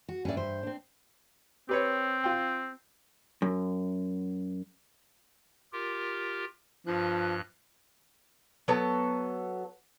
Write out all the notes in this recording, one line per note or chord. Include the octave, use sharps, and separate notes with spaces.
F#4
G2 C#4 D5 E5
C5
C4 D4
C4 G4 B4 C#5
F4 G5
F#2
F4 G4 A#4
G2 F3 F#6
F#3 B3 A4